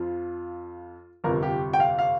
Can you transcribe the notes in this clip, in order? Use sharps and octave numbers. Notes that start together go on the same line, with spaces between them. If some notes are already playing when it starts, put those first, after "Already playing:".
Already playing: F2 F3 F4
G1 F2 C3 A#4
G4
G5
F5
F5